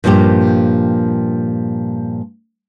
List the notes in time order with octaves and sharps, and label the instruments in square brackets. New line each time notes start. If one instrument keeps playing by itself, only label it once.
[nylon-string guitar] G2 A#2 F3 A#3 G4